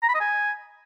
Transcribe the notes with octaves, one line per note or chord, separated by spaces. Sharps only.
A#5
B5
D#5
G#5